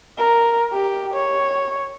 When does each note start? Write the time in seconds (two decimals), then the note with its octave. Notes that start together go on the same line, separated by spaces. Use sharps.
0.18 A#4
0.73 G4
1.14 C#5